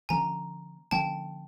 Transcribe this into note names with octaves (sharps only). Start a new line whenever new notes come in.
D3 F3 A#3 C#4 G#5 A#5
D3 F3 A#3 C#4 G5 A5